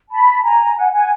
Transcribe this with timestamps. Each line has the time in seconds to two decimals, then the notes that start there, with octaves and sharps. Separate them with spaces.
0.10 A5 B5
0.43 G#5 A#5
0.77 F#5 G#5
0.93 F#5 G#5